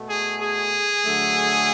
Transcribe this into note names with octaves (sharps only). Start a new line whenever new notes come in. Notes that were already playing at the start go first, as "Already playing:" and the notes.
Already playing: B2 A3
G#4
G#4
D3 F#3 A3